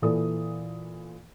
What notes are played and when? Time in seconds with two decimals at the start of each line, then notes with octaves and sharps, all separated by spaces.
0.02 A#2 E3 A4 D#6